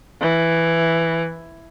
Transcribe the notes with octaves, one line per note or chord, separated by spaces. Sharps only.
E3